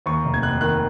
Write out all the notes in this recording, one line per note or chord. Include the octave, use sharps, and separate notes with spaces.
D#2 C#6
F1
G#6
F1 F#6
D#3 F#6